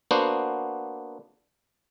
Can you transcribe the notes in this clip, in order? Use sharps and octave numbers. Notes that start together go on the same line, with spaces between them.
A#3 B3 D4 F#4 C5